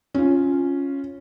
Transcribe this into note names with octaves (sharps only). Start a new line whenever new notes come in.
C#4 F4